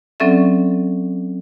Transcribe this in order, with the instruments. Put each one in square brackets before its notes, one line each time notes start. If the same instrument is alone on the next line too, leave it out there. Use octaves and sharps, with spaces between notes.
[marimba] F#3 C4 C#4 A4 D5 E5